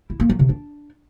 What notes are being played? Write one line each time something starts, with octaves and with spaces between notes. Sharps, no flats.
E4
A#3
F#3
C3
D4